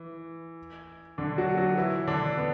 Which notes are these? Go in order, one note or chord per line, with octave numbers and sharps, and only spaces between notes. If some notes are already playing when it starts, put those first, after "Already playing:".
Already playing: E3
D3 D4
F#3 F#4
F#3 F#4
E3 E4
D3 D4
B3